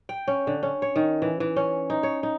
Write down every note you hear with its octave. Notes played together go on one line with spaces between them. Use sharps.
G5
C#4
D3
C#4
C#5
D#3
E3
E3
C#4
D#4
C#5
D#4